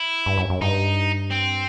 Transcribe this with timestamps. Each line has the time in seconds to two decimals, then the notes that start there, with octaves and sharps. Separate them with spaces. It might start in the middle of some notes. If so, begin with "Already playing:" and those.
Already playing: E4
0.26 G2
0.37 F#2
0.50 F#2
0.62 G2 D#4
1.32 C4